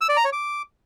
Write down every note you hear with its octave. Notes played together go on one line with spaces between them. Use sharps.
E6
D5
A#5
C#5
D6